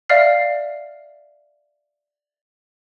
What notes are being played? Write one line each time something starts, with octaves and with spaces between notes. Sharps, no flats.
D5 E5 F5 F6 C7